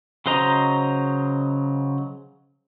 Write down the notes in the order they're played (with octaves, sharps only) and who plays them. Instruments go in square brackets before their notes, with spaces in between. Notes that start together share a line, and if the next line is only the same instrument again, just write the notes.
[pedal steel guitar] C#3 F#3 C5 D#5 A#5